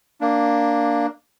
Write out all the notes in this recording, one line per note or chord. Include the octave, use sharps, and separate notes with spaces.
A#3 D4